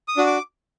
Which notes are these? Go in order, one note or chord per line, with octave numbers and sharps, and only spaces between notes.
D#6
D4 F#4
D6